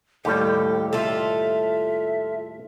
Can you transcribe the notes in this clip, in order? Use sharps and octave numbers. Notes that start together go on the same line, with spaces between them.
D#2 A2 G3 G4 A4
F4 A4 E5